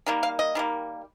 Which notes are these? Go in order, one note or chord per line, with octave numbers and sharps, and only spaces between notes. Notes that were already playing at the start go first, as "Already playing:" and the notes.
D#3 G3 A#3
F5
D#5
D#3 G3 A#3